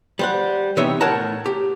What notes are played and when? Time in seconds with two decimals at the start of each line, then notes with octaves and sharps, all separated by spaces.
0.19 G3 C5 F#5
0.77 C3 E3 B3 D#4 C#5 E5
1.00 A2 A#4 C#5 F#5 A5 A#5
1.46 G4